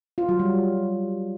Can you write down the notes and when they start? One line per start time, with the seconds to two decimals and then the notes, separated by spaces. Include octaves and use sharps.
0.18 F4
0.29 F#3
0.40 G3